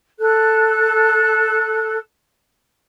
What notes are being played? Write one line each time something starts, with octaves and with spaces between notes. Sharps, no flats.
A4 F#6